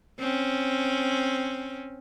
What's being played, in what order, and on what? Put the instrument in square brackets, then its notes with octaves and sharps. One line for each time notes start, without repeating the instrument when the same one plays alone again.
[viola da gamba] C4 C#4